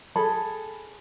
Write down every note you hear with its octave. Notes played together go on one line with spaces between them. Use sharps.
G#4 A4 B5